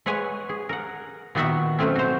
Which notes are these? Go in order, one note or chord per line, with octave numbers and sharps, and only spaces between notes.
G#3 B4 C#5 F#5 G#5
G#4
A#4 F#5
A#2 D#3 B3 F#4 E5 F#5
B2 F#3 A3 C4 C#4
F#4 C5